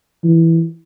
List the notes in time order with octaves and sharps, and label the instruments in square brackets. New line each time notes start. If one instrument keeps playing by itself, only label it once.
[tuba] E3